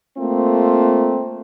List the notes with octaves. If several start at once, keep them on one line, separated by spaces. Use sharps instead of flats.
A3 A#3 C4 F4